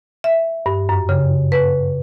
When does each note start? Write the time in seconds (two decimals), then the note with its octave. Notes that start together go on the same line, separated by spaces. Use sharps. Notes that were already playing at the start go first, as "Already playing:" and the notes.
0.24 E5
0.66 G2
0.89 F#2
1.09 C#3
1.52 B4